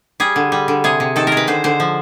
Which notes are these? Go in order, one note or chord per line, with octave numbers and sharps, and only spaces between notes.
G3 G#4
D3
G3
D3
C3 G#4
C3
D#3 A4
G#3 A#4
B4
D3 C5
D3 C5
F3